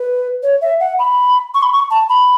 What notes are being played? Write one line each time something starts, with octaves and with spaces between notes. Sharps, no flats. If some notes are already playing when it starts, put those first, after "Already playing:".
Already playing: B4
C#5
E5
F#5
B5
C#6
B5
C#6
A5
B5